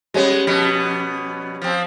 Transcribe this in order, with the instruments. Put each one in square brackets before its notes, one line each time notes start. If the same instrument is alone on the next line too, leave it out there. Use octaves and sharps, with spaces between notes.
[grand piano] G3 C#4 [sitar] G#3 B3
[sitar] F2 B2 B3
F3 C4